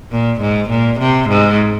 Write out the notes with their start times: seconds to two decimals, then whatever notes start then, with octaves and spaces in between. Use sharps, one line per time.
0.11 A#2
0.40 G#2
0.70 A#2
1.00 C3
1.29 G#2